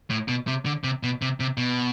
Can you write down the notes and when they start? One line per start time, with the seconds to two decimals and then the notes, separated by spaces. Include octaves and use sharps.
0.10 A2
0.28 B2
0.47 C3
0.66 D3
0.84 C3
1.03 B2
1.22 C3
1.40 C3
1.57 B2